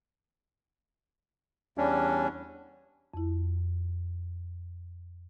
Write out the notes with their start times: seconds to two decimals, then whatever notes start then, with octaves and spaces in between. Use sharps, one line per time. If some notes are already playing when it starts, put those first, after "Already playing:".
1.78 E2 G3 C#4 D4
3.14 F2 E4